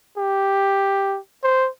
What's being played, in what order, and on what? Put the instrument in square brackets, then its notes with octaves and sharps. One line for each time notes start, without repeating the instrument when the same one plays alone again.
[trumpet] G4
C5